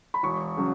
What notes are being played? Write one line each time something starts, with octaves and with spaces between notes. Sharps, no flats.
B5
E1 C#6
C#3 F#3